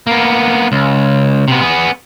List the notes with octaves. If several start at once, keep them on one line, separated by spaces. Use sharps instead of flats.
A#3 B3
C#2
C3 B3
B3 G#4